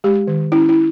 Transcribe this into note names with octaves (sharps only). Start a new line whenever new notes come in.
G#3 G4
D#3
C#4 E4
E4